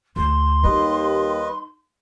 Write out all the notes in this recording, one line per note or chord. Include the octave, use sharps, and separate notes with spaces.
D2 C6
D#2 G3 D#4 B4 D#5